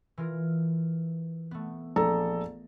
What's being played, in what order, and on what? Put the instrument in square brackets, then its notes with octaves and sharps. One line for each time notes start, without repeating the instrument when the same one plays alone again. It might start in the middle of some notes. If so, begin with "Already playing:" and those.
[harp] E3 F4 A#4
A3 B3
[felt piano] A#1 A4 A#5